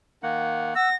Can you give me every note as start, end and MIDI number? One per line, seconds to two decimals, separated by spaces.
0.23 0.74 51
0.23 0.74 58
0.23 0.74 78
0.75 0.90 78
0.75 0.89 88
0.75 0.96 94